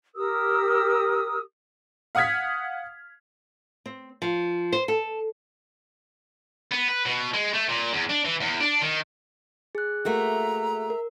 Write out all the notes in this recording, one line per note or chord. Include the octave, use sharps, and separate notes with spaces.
G4 A#4 D#6 E6
F5 F#5 D#6 F6 G#6 B6
C4
F3
C5
A4
B3
B4
B2
G#3
A3
A#2
E2
D4
E3
E2
D4
D#3
G#4 F#6
A3 A#3 F#4 E5 A#5 E6
A#4